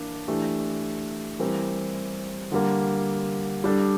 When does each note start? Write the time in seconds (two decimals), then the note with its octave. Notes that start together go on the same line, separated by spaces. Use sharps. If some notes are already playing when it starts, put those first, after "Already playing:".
Already playing: E3 A#3 D4
0.28 E3 A3 D4 G4
1.39 E3 G3 C4 G4 A#4
2.52 D3 G3 A#3
3.64 G3 D4 A4